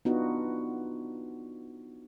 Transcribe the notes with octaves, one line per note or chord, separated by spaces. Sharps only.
B3 D4 D#4 F4 F#4